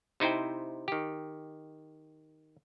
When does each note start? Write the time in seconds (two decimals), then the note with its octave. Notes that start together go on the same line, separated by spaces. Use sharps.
0.20 C3 D#4 E4 C5 G5
0.88 D#3 G4